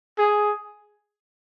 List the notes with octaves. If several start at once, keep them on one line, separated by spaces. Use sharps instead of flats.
G#4